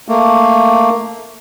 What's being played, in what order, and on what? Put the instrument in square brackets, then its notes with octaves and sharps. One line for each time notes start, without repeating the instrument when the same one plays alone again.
[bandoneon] A3 A#3